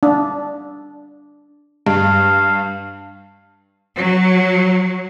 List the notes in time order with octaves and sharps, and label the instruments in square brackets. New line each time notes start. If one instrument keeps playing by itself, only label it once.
[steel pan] D4
[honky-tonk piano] G2 [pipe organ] F5
[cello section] F#3